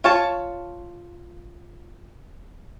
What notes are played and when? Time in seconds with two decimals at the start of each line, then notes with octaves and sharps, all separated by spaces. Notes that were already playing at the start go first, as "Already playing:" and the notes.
0.04 F4 C#5 A5